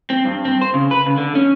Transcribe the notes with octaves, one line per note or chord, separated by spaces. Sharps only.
C4
G2
C4
C5
C#3
B4
C#3
D3
C#4